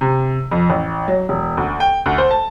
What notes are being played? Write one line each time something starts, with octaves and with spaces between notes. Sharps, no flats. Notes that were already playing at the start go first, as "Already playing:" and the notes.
C3
F2
A1
F#3
E1
D2
G5
D2
C5
A5